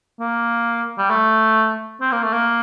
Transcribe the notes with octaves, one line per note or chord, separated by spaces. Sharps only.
A#3
G3
A3
C4
A#3
A3
A#3